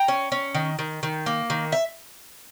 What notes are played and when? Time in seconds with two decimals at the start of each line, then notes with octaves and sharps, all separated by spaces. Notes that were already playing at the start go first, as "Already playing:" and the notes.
Already playing: G5 A#5
0.08 C#4
0.32 C#4
0.54 D#3
0.79 D#3
1.03 D#3
1.26 A#3
1.50 D#3
1.72 E5